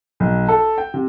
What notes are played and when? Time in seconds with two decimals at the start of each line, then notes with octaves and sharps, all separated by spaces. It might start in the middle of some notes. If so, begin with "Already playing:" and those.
0.20 B1
0.49 A4
0.78 G5
0.94 C3